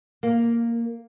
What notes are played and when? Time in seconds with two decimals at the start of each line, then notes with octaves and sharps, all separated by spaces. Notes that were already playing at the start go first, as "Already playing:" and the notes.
0.23 A#3